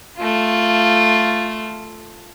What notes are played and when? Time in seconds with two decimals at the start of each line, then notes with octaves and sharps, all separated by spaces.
0.18 A3 F4